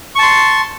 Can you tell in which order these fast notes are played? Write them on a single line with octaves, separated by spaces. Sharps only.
C#6 A5 C6